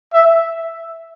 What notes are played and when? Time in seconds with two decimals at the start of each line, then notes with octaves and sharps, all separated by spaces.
0.13 E5